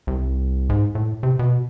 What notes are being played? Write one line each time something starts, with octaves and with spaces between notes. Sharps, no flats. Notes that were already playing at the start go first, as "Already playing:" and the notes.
C2
G#2
A2
C3
B2